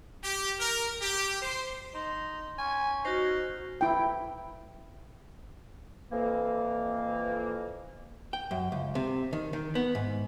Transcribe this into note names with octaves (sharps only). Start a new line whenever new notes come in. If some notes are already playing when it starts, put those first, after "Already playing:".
G4
A#4
G4
C5
D#4 C6
C#4 G#5
D#4 F#4 C5
E4 G5
F2 E3 A#3
G5
F#2
C#2
C3
D#3
D#3
B3
G#2